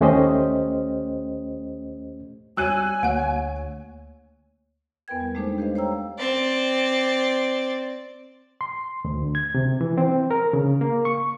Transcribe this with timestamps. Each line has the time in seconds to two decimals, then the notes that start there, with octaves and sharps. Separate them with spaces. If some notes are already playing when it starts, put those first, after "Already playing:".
0.01 D#2 A3 C#4 G4 C5 D#5
2.57 G3 F#4 C#5 G#5 E6 F#6 D#7
3.03 D2 A#3 C#5 F#5
5.08 E2 B3 A#4 B4 G5 G#6
5.20 G3
5.35 G#3 A3 D4 D#4 A4 C5
5.58 G4 B4 C5 D#5 F5
5.75 C5 C#5 F5 G5 A#5 E6
6.18 C4 D5
8.61 C6
9.05 D2
9.35 G#6
9.55 C3
9.81 E3
9.98 C4
10.31 A#4
10.53 C#3
10.81 A#3
11.05 C#6